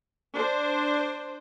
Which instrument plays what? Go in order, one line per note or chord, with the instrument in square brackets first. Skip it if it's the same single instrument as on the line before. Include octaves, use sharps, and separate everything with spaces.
[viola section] D4 C5